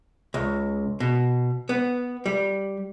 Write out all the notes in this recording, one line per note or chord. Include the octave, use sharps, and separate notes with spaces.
C#2
B2
B3
G3